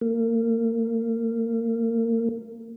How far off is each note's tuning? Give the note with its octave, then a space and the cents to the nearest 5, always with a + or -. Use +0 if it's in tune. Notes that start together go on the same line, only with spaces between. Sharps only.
A#3 -30